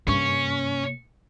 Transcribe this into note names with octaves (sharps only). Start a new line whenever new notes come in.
G2 C3 A#3 C#4 C#6